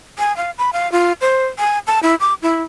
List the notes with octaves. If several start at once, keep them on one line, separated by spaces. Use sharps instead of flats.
G#5
F5
B5
F5
F4
C5
G#5
A5
E4
D6
E4